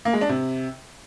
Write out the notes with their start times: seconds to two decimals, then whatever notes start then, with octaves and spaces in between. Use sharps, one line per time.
0.05 A#3
0.13 G#3
0.21 D4
0.29 C3